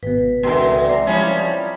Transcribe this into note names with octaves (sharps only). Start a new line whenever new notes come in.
G#1 B2 B4
C#2 B2 D3 E3 C4 A#4
G#3 D5 A#5
F3 G3 C#4 E4 B5
B5